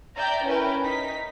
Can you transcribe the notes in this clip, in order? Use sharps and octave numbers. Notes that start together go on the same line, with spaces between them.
D5 E5 G5 A#5 G6
C#4 E4 A#4 B4 G5
D#4 B6